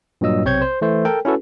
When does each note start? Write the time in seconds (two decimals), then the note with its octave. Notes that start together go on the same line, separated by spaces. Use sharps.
0.21 G2 A#2 F#3 D#5 E6
0.44 B1 C3 C4 C#5 G6 G#6
0.62 C5
0.82 E3 A3 C5
1.05 A4 A#4 G5
1.25 C#4 E4 F#4 A4 B4